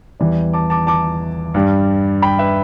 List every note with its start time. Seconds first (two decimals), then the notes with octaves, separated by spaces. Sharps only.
0.20 E2 E3 G3 D5
0.53 A5 D6
0.70 A5 D6
0.87 A5 D6
1.54 G2 G3
2.22 G5 B5
2.39 B4 E5